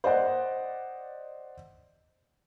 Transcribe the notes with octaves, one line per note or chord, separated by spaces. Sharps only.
C5 D5 D#5 F#5